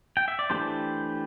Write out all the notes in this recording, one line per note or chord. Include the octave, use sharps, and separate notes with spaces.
G5
E5
D5
E3 A3 D4 G4 C5